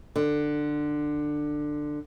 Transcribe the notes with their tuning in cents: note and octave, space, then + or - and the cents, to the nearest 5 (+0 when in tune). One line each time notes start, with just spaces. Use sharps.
D3 +15